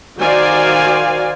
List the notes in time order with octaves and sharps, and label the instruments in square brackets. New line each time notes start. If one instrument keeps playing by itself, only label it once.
[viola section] D#3 F#4 C5 D5 F5 G#5